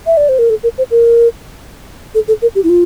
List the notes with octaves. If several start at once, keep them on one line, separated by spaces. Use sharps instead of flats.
E5
D5
C5
A#4
A4
A#4
C5
A#4
A4
A4
A#4
G4
E4
F4